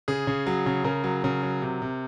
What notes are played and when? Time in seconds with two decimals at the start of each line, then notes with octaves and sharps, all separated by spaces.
0.08 C#3 G#4
0.27 C#3
0.47 F#3
0.66 C#3
0.84 C#3 A#4
1.04 F#3
1.24 C#3
1.43 F#3
1.62 C3
1.82 C3